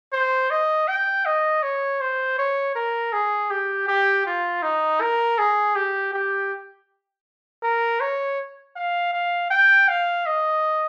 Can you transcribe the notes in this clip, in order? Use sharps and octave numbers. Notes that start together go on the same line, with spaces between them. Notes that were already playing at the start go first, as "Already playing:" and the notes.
C5
D#5
G5
D#5
C#5
C5
C#5
A#4
G#4
G4
G4
F4
D#4
A#4
G#4
G4
G4
A#4
C#5
F5
F5
G5
F5
D#5